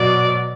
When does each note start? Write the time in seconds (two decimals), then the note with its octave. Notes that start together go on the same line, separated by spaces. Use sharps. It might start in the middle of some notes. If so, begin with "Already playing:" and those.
Already playing: B2 F#3 D5